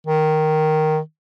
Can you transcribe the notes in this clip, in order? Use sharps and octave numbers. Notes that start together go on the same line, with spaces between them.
D#3